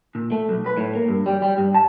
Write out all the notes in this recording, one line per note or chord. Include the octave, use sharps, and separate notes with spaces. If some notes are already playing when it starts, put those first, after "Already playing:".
A#2
A3
B1
B4
A2
A#3
G2
G3
G3
G2
A5